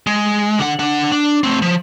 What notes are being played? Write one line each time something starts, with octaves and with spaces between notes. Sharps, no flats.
G#3
D3 F#5
D4 F#5
D4
A3 C4
F3